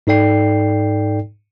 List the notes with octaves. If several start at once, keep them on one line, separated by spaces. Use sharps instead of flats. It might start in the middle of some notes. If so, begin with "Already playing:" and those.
G#2 D#4 A4 D5 G5 C7